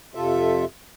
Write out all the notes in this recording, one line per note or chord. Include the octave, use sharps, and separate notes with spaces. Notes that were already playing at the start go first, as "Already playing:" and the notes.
F2 C3 F4 A4 E5